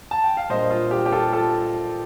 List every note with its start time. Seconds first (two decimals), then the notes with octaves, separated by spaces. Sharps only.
0.11 A5
0.24 G5
0.37 F5
0.49 A#2 G3 A#3 D4 C5 D#5
0.71 F4
0.91 G4
1.06 G4
1.12 F4 A4
1.33 F4 A4